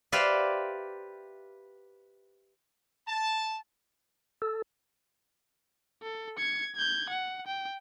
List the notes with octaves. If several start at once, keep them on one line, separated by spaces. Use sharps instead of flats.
G4 B4 C5 D5 E5 F5
A5
A4
A4
G#6 C#7
G6 G#6
F#5
G5